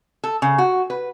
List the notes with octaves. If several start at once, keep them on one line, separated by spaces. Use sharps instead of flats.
A4
C#3
F#4
B4